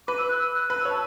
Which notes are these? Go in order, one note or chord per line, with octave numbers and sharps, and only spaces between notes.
B4 D6
E6
F#6
E6
F#6
B4 F#6
E6
C#5 A5